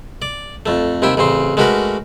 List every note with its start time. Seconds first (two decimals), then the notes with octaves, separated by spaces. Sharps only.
0.22 D5
0.66 F2 A3
1.02 D#2 C3 E4 G5
1.17 A1 C#3 C4 C6
1.57 G#3 A3 C#4 F#4 A#4 B4